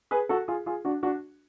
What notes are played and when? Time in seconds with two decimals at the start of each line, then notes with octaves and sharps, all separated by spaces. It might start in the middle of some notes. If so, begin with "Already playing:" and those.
0.11 G#4 B4
0.29 F#4 A4
0.48 F4 G#4
0.66 F4 G#4
0.85 D4 F#4
1.03 D4 F#4